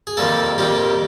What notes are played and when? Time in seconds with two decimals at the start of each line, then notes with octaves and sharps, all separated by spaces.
0.07 G#4
0.17 F2 C3 D#3 G3 A#3 A4
0.58 F2 C3 D#3 G3 A#3 G4